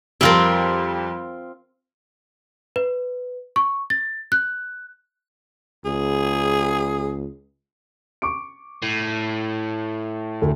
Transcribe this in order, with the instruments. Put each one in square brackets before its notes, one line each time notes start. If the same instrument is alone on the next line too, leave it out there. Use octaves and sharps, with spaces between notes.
[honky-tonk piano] F2 G3 [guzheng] C4 F4 A#4
[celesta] B4
C#6
A6
F#6
[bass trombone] C#2 [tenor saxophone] G#4
[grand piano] C#6 D6 D7
[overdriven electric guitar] A2
[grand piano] D2 A4